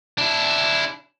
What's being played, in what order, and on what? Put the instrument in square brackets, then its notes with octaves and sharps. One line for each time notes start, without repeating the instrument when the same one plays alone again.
[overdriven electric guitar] D4 E4